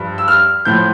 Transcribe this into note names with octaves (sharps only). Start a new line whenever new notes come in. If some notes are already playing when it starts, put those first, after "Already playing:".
Already playing: G2 F3
E6
F6
A2 F3 G6